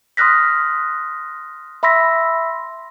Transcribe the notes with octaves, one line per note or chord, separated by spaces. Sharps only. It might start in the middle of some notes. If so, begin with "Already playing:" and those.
C6 D#6 F6 F#6 A#6 B6
E5 B5 C6 E6 A#6 B6